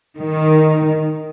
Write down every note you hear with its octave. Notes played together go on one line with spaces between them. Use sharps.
D#3